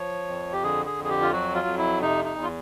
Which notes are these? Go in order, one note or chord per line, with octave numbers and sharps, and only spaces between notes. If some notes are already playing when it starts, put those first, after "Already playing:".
Already playing: F3 C#5
F2
G4
D3 G#4
G#4
F2
G#4
G4
F4
F#3 F#4
F4
F2
E4
C3 D#4
D#4
E2
F4